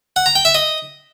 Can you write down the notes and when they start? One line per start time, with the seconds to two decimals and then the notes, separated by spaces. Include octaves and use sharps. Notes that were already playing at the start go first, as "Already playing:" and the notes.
0.16 F#5
0.26 A#5
0.35 G5
0.45 E5
0.55 D#5